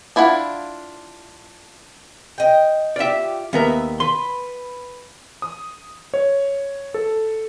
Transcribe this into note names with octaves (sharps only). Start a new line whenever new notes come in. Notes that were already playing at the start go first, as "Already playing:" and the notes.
D4 E4 F4 F#5
D#5 G5
F4 G4 D5 E5
D#2 B3 A#4 E5
B4 C6
D#6
C#5
A4